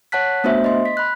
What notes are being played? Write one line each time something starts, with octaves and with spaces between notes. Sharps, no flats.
C#5 F#5 A5 F#6 B6
A3 B3 D4 F#4 C5 E5
D#5 C6
B6
B5 F#6